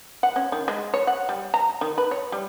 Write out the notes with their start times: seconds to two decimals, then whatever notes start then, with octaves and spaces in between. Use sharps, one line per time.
0.23 F#5
0.36 C#4
0.52 D#3
0.68 G#3
0.94 C#5
1.07 F#5
1.29 G3
1.54 A#5
1.81 D#3
1.98 B4
2.11 C#5
2.32 G3